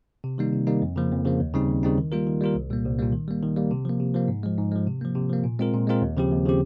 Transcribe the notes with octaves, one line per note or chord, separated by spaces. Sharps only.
C3
D#3 G3 A#3 D#4
C3
D#3 G3 A#3 D#4
F2
C#3 F3 A#3
F2
C#3 F3 A#3
D#2
C#3 G3 C4 D#4
D#2
C#3 G3 C4 D#4
D#3
G3 A#3 F4 A#4
D#3
G3 A#3 F4 A#4
C2
A#2 G3 A#3
C2
A#2 G3 A#3
D#3
G3 A#3
D#3
G3 A#3
C3
F3 A#3
C3
F3 A#3
G#2
F3 G#3
G#2
F3 G#3
C3
F3 A#3
C3
F3 A#3
A#2
G#3 C4 F4 A#4
A#2
G#3 C4 F4 A#4
D#2
C#3 F3 C4 G4
D#2
C#3 F3 C4 G4